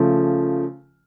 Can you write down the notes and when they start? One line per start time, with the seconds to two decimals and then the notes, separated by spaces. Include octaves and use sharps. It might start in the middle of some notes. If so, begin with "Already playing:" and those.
Already playing: C#3 F3 A3